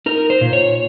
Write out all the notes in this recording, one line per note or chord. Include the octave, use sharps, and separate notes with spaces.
D#4 A#4
C5
A#2
C#5